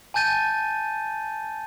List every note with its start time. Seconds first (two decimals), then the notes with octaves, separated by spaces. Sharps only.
0.14 G#5 A5 G6 A6 D#7